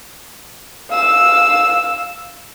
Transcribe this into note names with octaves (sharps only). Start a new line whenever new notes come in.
F5 E6